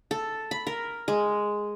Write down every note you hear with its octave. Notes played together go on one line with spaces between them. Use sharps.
A4
B5
A#4
G#3